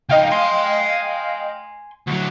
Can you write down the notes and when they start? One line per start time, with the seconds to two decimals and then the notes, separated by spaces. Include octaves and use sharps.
0.09 C#2 D#4 D#5 F5 G5
0.30 G#5 C6
2.07 D2 F#3